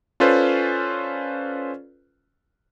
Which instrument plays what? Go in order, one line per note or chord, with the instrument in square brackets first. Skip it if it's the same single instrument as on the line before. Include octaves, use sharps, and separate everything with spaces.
[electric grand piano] C#4 F4 A4 B4 C5 D5